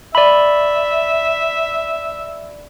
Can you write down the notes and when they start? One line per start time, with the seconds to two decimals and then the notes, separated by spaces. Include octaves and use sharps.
0.15 D5 E5 B5